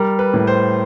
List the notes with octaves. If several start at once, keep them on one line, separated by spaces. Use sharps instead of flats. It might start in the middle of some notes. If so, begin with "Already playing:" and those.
Already playing: G3 A#4
B4
A2
C5